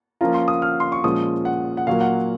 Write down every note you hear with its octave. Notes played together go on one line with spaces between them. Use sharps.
F3 A#3 C#4 F4 A#5
C6
D#6
F6
C6
C#6
A#2 F3 G#3 C#4 D#6
F#5
F#5
A#2 F#3 A#3 F5
F#5